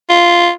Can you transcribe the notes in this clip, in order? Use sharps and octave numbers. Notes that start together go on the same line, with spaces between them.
F4